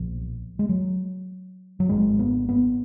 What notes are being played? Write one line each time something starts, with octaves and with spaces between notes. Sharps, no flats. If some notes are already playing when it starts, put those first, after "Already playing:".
Already playing: B1 A#2 F3
G#3
F#3
F#3
G#1 G#2 G#3
B3
B3